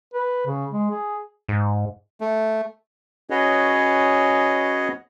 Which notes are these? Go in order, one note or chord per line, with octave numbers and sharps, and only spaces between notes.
B4
C#3
G#3
G#4
G#2
A3
C#4 F#4 G#4 B4 C#5 D#5